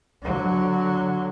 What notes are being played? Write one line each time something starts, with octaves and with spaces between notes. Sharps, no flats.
D3 F#3